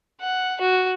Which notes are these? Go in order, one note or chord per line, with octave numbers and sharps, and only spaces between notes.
F#5
F#4